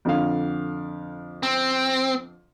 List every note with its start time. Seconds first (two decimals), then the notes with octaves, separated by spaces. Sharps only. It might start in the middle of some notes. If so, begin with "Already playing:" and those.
0.05 F2 D3 F5
1.43 C4